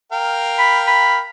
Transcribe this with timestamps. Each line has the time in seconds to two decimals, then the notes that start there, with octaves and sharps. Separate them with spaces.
0.12 A#4 F5 G5
0.58 B5
0.87 B5